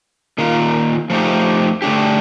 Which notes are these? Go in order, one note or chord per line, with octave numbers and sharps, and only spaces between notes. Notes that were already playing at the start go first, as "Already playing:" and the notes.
D#3 A#3 F4
F3 A3 D#4 G4
D3 A3 D4 G4